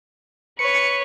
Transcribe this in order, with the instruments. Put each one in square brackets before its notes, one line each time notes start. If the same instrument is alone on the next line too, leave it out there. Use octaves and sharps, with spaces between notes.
[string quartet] B4 C#5 [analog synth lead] C#7